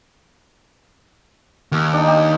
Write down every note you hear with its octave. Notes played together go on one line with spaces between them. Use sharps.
D#2
D4 D#4
G4